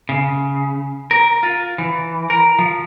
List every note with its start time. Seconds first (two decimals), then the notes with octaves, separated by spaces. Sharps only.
0.09 C#3
1.11 A#4
1.43 F4
1.78 E3
2.30 A#4
2.59 F3